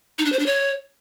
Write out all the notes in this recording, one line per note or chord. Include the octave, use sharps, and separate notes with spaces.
D#4
D4
C5
D4
C#5